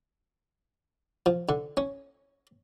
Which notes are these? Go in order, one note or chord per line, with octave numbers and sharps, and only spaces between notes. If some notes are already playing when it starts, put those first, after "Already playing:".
F3
D3
C#4